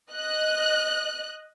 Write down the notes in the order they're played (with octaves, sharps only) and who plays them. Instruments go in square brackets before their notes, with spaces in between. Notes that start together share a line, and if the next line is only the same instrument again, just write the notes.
[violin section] D#5 F#6